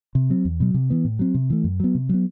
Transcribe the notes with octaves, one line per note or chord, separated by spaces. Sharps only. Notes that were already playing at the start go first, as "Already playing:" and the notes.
C3
F#3 C4
E2
B2 F#3
C3
E3 B3
A2
F#3 C4
C3
E3 A3
F#2
F#3 B3
C3
F#3 B3